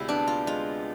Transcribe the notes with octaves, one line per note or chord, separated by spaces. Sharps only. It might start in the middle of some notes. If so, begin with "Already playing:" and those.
Already playing: D2 C3 G#3 E4
B3 D4
F4
G#3 F4